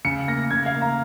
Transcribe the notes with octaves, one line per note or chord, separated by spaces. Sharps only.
C#3 C#7
A#3 A#6
C#3 G#6
F5
A#3
A#5